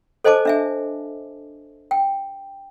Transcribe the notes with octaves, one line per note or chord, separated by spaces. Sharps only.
A4 C5 D#5 G#5 A5 D6
D4 E5 G#5
G5